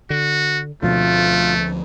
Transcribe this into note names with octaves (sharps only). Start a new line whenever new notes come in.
D3 F#4
D2 B2 D3 F3 A3 C4 F4